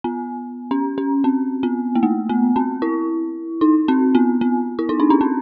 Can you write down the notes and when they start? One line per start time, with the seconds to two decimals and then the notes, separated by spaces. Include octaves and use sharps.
0.04 B3
0.71 C#4
0.98 C#4
1.24 C4
1.63 B3
1.95 A#3
2.03 A3
2.29 B3
2.56 C4
2.82 E4
3.61 D#4
3.88 C4
4.15 B3
4.41 B3
4.79 E4
4.89 D#4
5.00 D4
5.10 C#4
5.21 C4